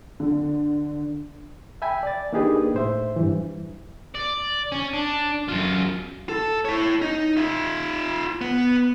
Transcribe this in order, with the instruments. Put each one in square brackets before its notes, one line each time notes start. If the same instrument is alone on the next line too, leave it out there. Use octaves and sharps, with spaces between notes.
[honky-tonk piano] D3
[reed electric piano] E5 G5 G#5 B5
D5 A6
A#3 D4 D#4 G4 G#4 B4
A2 C5 E5
G2 E3
[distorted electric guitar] D5
C#4
D4
F#2 F4
[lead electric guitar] A4
E4 C#5
D#4
F4 E5
B3